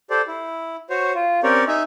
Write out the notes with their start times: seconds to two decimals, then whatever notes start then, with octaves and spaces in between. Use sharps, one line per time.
0.10 G4 A4 C5 D5
0.28 E4
0.90 F#4 C5 C#5
1.15 F4
1.43 C4 C#4 G4 A#4 C#5 D5
1.68 D#4 E5 G#5